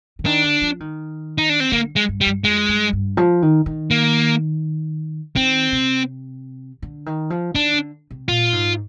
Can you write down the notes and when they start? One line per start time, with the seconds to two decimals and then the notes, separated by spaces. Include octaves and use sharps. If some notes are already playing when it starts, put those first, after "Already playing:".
0.19 D3
0.25 D#3 D4
0.44 D3
0.62 F3
0.80 D#3
1.38 D#4
1.49 D4
1.60 C4
1.72 D3 A#3
1.96 G#3
2.09 G2
2.21 G3
2.26 G2
2.44 F2 G#3
2.69 G2
2.93 G2
3.17 F3
3.42 D#3
3.66 D#3
3.91 A#3
5.36 D#3 C4
5.72 C3
6.82 D3
7.06 D#3
7.30 F3
7.55 D#3 D4
7.73 D3
8.11 C3
8.28 A#2 F4
8.53 G#2